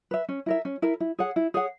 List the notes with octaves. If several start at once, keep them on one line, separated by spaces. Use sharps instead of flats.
B4 E5
C#4
E4 A#4 E5
C#4
E4 A#4 E5
E4
G#4 C#5 F#5
E4
G#4 C#5 F#5